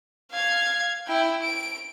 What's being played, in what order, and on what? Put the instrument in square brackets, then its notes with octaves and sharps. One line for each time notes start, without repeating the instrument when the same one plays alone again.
[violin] F5 G#6
E4 G5
D7